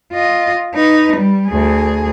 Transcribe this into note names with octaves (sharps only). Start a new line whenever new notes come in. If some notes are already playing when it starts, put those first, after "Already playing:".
F4 D#5
D#4 B4
G3
D2 G#4